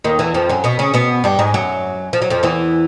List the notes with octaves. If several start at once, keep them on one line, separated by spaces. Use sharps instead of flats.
D#2 D#3
E2 E3
F2 F3
F#2 F#3
B2 B3
C#3 C#4
B2 B3
G2 G3
G#2 G#3
F#2 F#3
F3
F#3
F2 F3
E2 E3